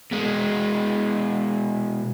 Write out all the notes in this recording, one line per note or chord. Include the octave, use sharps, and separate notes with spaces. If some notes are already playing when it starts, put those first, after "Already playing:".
B2 G#3